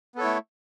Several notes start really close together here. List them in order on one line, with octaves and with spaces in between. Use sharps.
B3 A4 C#5 E4 A3